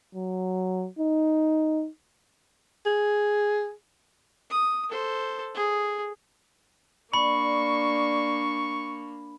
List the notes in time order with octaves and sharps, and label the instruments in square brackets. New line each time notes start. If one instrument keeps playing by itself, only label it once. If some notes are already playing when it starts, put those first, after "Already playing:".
[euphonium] F#3
D#4
[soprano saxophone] G#4
[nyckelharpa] D#6
A4 C5
G#4
[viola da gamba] A#3 D4 [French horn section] D5 [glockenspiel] B5 [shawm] C#6